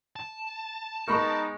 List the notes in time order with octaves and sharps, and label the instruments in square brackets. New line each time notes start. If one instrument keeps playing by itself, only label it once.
[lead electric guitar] A5
[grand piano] G#3 B3 C#6 [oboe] D#4 [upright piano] A#4 B5